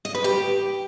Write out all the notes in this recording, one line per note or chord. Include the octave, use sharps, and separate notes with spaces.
D#5
B4
G4